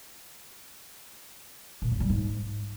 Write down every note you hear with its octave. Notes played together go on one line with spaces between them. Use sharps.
A#2
F#2
G3
G#2